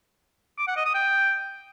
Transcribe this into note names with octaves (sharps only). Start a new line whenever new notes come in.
D6
F#5
D#5
D#6
G5